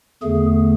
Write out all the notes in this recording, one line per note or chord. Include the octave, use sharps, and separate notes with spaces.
E2 D3 A3 G#4